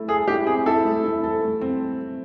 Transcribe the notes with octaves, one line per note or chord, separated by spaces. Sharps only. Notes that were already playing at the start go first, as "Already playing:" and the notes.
Already playing: A3 E4
G#4 A4
E4 G4
C4 G#4
E4 A4
A3
E4
A4
A3
C4